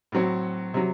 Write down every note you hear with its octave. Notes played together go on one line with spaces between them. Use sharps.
A2 F#3 C4 F#4
C3 F#3